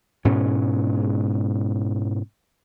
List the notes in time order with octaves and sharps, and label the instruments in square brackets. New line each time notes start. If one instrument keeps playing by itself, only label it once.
[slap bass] G#2 B2 C#4